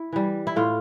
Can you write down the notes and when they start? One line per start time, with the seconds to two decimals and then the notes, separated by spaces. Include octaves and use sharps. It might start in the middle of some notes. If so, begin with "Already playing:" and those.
Already playing: E4
0.12 E3 G3
0.47 E4
0.56 A2 F4